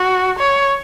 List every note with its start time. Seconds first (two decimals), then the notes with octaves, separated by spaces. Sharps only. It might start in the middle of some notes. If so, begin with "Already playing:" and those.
Already playing: F#4
0.39 C#5